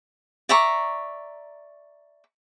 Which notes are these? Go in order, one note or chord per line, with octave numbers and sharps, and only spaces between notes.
D5 E5 A#5 C#6